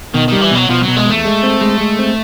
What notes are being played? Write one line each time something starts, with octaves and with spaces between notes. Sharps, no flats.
B2 D#3
D#3 G3
E3
B2 F#3
B2 F3
F#3
B2
G#3
E2 A3
G#3
C4
G#3
G#3
C4